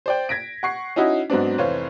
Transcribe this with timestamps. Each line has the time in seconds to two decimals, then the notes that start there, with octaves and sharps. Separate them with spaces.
0.06 C5 D5 G5
0.29 G#6 A#6 B6 D7
0.63 F#5 C#6 C7
0.96 C#4 D#4 E4 F#4 D#5
1.30 G#2 F#3 B3 C4 D4
1.58 F1 E3 C5 C#5 F5